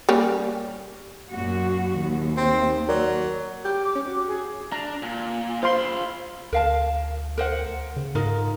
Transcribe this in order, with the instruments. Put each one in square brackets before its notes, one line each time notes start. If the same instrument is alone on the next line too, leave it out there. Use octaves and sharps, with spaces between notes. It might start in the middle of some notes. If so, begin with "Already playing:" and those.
[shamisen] G3 A#3 C#4
[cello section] F#2 A#2 F#4
[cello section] D#2 [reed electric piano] D#3
[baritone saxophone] C4
[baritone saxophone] F#3 [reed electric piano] A#4 D5
[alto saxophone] G4
[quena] D6
[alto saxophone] C#4
F#4
[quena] G#4
[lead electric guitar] D4 [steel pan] A#5
[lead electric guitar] A#2
[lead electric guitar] F4 B5 [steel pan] C5 F5 C6
[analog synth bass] D2 [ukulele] A#4 F5 A5
[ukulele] A#4 C5 F#5
[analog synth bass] C#3
[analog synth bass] G#2 [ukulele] D#4 F4 A#4